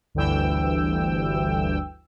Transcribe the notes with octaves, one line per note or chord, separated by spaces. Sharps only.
G1 D2 G2 E3 G5 E6